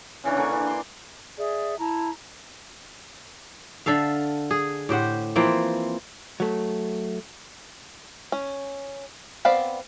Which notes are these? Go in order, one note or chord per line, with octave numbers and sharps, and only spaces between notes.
C#3 E3 C#4 D4
D3 A#3 C#6
E3 D4
C6 D6
G#4 D5 E5
E4 A5 A#5
D3 A4 E5 F5
G#4
A2 G4 C5 F#5
E3 F3 A#3 C4
F#3 A3
C#4
B3 C4 D5 F5 B5